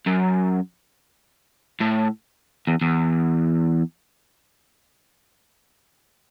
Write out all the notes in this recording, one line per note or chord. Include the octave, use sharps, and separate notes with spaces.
F#2
A2
E2
E2